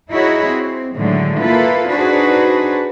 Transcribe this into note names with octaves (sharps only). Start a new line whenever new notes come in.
D#4 E4 F#4 G#4 C#5 D#5
C4
A2 D3 D#3 F#3 G#3 A3
A#3 E4 F4 A4 B4
D4 D#4 F#4 G#4 B4 C5